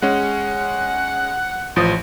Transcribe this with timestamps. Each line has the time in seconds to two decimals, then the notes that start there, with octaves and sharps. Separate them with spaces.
0.02 G#3 C#4 F#5
1.76 A1 F3 D#6